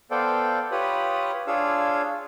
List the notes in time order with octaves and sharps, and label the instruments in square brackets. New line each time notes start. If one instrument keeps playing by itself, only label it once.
[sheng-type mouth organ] B3 A4 C5 D5 F5 G5
F4 G4 B4 C#5 B5 D#6
D4 F4 G#4 C#5 F5 E6